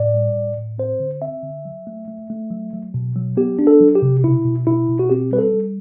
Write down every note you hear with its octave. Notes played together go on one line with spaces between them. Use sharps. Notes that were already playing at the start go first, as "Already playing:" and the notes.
Already playing: A2 D5
G3
A2
A2
C4 C5
D3
C4 E5
D3
F#3
A3
A3
A3
F#3
F#3
B2
F#3
B3 G4
D4
A4
F#3
G4
C3
B2 E4
B2
B2 E4
B2
F#4
C4 G4
G3 B4
A4
G3